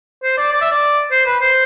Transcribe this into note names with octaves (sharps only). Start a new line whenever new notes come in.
C5
D5
D5
E5
D5
C5
B4
C5